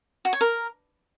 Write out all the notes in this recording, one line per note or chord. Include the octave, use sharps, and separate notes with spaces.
F#4
C#5
A#4